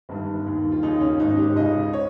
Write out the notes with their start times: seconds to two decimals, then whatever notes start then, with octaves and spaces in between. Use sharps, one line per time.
0.09 G1 G2 D#3
0.46 D#2 D#3
0.72 F4
0.83 D#2 C#3 D#4
1.01 C#4
1.19 G#1 G#2 D#3 D#4
1.38 G4
1.56 C#2 C#3 D#5
1.93 C#5